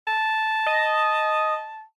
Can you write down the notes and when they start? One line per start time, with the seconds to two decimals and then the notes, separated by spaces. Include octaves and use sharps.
0.07 A5
0.66 D#5